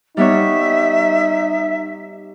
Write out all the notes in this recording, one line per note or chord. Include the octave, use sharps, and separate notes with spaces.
G3 B3 D#4 C#5 E5